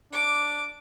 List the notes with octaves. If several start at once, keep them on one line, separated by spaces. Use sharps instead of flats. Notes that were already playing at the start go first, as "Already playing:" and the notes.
D4 D6